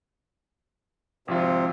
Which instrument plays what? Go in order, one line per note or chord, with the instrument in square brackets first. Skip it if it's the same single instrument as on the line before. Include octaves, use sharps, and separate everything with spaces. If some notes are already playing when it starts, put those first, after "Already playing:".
[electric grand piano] G#1 F3 F4 [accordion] C3